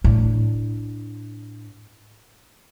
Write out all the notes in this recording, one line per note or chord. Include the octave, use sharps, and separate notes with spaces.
A2 D4